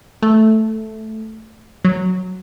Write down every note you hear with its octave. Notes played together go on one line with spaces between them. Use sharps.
A3
F#3